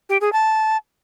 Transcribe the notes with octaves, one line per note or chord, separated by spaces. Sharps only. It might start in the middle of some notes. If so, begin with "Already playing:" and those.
G4
G#4
A5